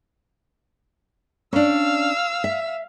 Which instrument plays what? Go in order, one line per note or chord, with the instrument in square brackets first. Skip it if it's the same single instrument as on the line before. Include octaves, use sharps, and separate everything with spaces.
[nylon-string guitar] C#4 D4 [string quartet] F5 E6
[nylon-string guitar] E5